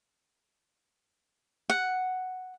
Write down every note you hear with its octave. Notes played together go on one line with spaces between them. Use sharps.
F#5